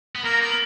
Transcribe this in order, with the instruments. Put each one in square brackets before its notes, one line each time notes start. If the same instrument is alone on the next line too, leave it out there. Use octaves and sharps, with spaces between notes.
[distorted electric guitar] B3
[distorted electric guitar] A#3 [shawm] A#4
[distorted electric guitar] B3 [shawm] A#4